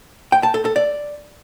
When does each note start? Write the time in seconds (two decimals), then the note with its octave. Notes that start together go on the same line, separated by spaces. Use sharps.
0.32 G5
0.43 A5
0.54 A4
0.65 A4
0.76 D5